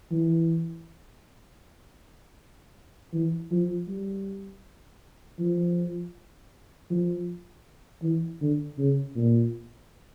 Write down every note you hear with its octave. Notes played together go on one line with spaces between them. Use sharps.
E3
E3
F3
G3
F3
F3
E3
D3
C#3
A#2